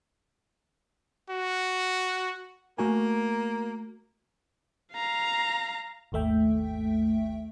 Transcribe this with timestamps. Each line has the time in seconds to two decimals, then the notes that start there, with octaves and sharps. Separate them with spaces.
1.30 F#4
2.78 A3 A#3 F#4 G#5
4.93 F5 A#5
6.12 G#1 D#2 A3 E5 G5